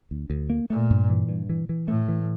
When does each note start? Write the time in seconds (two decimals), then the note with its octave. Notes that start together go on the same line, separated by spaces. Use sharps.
0.11 D2
0.30 D2
0.50 A#3
0.70 A#2 A3
0.90 G2
1.10 E3
1.29 G2
1.49 E3
1.69 E3
1.88 A2 A3
2.08 E3